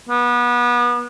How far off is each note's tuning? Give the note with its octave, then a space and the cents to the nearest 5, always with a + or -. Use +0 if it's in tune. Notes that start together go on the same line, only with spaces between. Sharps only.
B3 -30